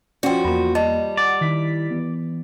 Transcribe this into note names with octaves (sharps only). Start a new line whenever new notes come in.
F3 C#4 F#4 D5 G5
E2 A#3 F4 A#5
G3 D#5 A5
D5 F#5
D#3 E4 B6
E3 B3